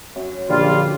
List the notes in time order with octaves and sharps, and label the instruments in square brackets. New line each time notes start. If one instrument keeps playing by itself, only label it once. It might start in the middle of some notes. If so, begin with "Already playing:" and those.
[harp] F#2
[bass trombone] A#1 [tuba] D3 [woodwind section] G3 A#3 F4